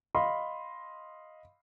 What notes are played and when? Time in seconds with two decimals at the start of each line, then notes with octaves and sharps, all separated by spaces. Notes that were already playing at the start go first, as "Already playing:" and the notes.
0.15 D#5 F5 B5 C6